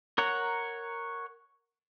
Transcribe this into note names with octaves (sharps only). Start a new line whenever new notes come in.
A#4 C#5 F#5 A#5